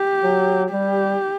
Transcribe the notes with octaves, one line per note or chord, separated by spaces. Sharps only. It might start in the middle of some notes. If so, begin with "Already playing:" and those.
Already playing: G4
F#3
G3 G4